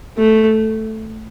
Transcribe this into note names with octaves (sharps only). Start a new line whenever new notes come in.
A3